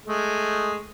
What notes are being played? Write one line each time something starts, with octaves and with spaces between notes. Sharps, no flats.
G#3 A3